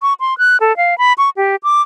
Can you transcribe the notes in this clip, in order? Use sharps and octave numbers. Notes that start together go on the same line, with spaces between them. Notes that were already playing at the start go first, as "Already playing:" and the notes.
C#6
C6
F#6
A4
F5
B5
C#6
G4
D6